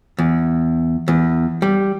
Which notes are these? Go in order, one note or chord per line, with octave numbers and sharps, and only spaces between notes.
E2
E2
G3